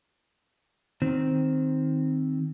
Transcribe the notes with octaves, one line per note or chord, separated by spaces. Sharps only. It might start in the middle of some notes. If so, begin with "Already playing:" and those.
D#3 C4